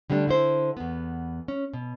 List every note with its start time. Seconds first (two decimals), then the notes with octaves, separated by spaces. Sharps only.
0.10 D3 G3 A3 C#4 D4
0.27 D3 E4 C5
0.77 E2 B3
1.48 C#4
1.73 B2